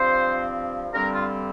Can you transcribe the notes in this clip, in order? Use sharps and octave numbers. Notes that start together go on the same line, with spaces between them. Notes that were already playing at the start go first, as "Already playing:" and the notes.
Already playing: G2 F3 C4 C5
G2 D3 G3 C4 A#4
F4